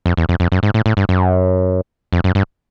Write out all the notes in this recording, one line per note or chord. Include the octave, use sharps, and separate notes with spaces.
F2
E2
F2
F2
F#2
G#2
A2
A2
G2
F#2
F2
F#2
G2